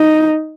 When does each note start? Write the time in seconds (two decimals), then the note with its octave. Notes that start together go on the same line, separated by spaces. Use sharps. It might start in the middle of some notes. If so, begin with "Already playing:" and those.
Already playing: D#4